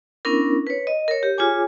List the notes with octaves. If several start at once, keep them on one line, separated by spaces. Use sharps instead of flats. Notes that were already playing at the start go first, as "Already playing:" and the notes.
B3 C#4 D4 E4 A#4
B4 C#5
D#5
A#4 C#5
G4
F4 G#4 C#5 G#5 D6